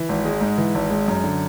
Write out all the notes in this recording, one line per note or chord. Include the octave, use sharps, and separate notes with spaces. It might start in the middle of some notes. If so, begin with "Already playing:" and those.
Already playing: E3
G#1
G#3
G#2
E3
G#1
G#3
F#2
D3